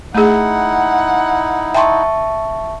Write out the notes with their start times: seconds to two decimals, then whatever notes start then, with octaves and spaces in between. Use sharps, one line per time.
0.14 A3 D#4 E4 G#4 F#5
1.75 E5 G5 A5 C6 C#6